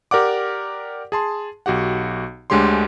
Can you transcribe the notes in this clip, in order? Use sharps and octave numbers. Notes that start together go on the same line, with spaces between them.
G4 A#4 D5 F#5 D6
G#4 A5 C6
B1 F#4 G4 F#5
D2 D3 G#3 G4 C#5 C6